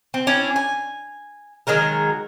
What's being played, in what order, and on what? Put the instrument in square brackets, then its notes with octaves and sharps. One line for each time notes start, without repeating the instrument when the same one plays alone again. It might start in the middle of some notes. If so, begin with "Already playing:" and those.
[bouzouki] C4
C#4 D4 E4
G#5
D#3 F#3 G#3 A#4